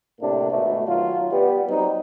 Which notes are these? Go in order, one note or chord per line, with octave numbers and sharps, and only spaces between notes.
A2 C3 A#3 D4
G#1 B2 A3
D#3 F#3 F4
G3 B3
F#3 G3 C4 D#4